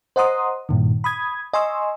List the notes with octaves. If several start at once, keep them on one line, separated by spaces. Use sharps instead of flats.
C5 D#5 F#5 A#5 C6 D#6
G2 A#2 D#3
B5 D#6 G#6
D#5 G#5 C6 C#6 E6